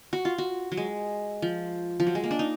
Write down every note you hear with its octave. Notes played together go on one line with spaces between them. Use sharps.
F#4
F4
F#4
F#3
G#3
F3
F3
F#3
G#3
A#3
D4
D#4